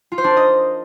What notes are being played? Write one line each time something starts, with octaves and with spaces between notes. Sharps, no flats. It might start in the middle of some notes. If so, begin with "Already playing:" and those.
F4
C5
D4
A#4
D#5